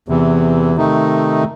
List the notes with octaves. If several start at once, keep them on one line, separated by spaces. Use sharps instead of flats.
E2 C3 E3
C3 D#3 A3 D#4